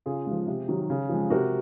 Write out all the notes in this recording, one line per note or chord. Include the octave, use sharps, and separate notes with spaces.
C#3 F4 G#4
F3 G#3
C3
D#3 F#3
C#3
F3 G#3
C3 F#4 A#4